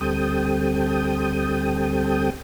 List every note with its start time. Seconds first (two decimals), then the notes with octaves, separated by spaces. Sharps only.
0.01 D2 G3 C4 A4 G5 D#6